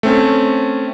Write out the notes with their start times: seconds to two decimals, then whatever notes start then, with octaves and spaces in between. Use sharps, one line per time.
0.03 A3 C4 C#4